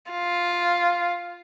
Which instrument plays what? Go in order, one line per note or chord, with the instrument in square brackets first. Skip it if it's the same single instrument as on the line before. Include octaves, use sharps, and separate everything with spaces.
[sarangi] F4